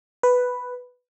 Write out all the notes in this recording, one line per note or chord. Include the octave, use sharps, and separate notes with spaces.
B4